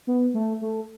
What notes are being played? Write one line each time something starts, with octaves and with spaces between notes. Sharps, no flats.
B3
A3
A3